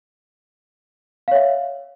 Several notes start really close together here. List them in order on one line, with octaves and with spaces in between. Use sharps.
F5 C#5 E5